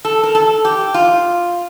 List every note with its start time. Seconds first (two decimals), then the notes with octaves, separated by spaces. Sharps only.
0.05 A4
0.23 A#4
0.35 A4
0.65 G4
0.94 F4